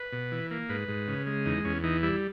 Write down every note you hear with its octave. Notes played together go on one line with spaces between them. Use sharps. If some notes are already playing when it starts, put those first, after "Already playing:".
Already playing: B4
B2
E3
A#3
G#2 B4
G#2
C#3
G#3
E2 D#4
E2 C#4
E3 D#4
G3 E4